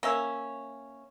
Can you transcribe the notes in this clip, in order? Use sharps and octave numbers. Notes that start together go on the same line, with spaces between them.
A#3 C#4 E5